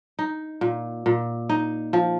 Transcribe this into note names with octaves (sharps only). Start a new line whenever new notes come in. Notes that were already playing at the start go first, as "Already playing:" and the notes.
D#4
A#2
A#2
D#4
F3